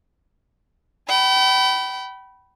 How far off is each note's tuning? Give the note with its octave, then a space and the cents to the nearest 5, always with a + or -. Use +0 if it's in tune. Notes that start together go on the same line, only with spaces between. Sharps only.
G5 -40 B5 +0